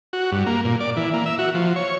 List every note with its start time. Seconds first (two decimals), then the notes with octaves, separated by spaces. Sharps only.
0.13 F#4
0.32 G2
0.46 A#3
0.65 A#2
0.80 D5
0.97 E3
1.13 A#3
1.26 E5
1.38 F#4
1.54 F3
1.76 C#5